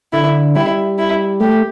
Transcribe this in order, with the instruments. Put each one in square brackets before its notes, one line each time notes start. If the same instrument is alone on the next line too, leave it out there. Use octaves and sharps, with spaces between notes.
[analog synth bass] D3 [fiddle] E4
[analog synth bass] G3 [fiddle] E4
[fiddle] E4
[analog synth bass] A3 [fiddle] G4